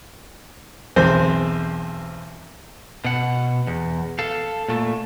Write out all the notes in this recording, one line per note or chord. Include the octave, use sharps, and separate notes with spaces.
B1 E2 C4 C5
B2 F#5
E2
A4 F5
A#2 A3